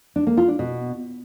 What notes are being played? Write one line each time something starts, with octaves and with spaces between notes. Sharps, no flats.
D4
A#3
F4
D4
B2